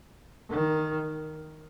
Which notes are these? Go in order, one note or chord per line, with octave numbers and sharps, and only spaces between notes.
D#3